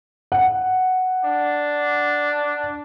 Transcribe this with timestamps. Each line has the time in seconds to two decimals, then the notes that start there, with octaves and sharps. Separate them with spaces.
0.32 F#5
1.25 D4